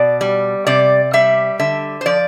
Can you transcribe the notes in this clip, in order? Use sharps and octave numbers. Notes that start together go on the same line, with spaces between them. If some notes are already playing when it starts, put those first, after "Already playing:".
Already playing: B2 D5
G3
C3 D5
G3 E5
D3 E5
C5
F3 D5